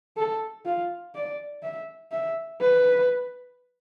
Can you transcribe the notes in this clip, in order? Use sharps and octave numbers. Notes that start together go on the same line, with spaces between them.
A4
F4
D5
E5
E5
B4